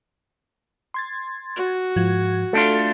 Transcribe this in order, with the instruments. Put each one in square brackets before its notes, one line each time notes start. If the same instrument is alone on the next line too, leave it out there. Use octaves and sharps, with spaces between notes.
[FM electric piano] C6 G#6 A6
[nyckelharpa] F#4
[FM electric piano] G#2 F3 G#6
[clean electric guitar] A3 D4 F4 [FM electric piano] A4